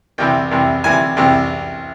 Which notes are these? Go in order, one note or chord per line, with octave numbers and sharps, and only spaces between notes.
C2 C3 E3 G5
C2 C3 E3
C2 C3 E3 G#5
C2 C3 E3